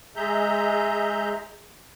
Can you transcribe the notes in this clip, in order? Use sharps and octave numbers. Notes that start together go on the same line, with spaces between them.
G#3 G#4 E5 A#5 G6